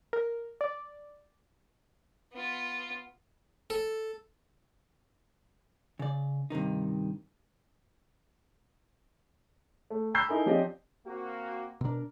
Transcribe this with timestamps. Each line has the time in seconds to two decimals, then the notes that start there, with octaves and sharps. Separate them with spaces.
0.13 A#4
0.61 D5
2.33 B3 F4
3.70 A4
5.99 C#3 D5
6.50 G2 C3 D#3 D#4
9.90 A3
10.14 A#5 B5 C#6 E6 G6 C7
10.29 D#4 E4 A4 A#4 G#5
10.46 F3 C4 C#4 G4 D5 D#5
11.05 A#3 C4 F#4
11.81 B2 D4 A#4